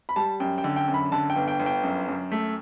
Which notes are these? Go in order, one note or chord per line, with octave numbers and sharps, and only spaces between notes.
B5
G3 A5
F#2 G5
G5
D3
G5
F#2
B5
D3 A5
G5
G1
G5
G1
G5
F#2
F#2
A3